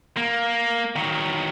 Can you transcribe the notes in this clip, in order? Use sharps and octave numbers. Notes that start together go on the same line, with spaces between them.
A#3
D#3 F#3